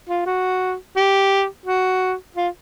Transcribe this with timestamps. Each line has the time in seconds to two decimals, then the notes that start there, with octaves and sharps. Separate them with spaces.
0.09 F4
0.26 F#4
0.97 G4
1.66 F#4
2.36 F4